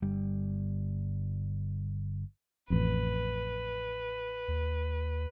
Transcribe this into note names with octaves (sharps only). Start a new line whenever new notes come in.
G1 G3
A1 F2 B4
D#2